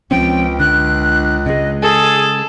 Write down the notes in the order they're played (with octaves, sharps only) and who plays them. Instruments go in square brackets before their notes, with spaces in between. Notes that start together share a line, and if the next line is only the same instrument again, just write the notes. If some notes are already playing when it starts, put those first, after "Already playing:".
[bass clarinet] C#2 [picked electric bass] F3 C4 C#4 [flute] G5
[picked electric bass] D3 [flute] F#6
[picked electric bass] C#3 G#3 [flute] D#5
[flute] G#4 [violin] A4